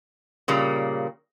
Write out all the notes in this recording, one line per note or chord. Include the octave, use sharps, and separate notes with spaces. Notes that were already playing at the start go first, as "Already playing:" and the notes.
A#2 C#3 G3 A#3